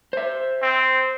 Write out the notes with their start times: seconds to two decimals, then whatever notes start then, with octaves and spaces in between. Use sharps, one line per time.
0.13 C5 E5
0.62 C4